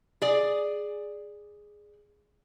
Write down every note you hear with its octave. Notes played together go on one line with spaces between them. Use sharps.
G#4 D5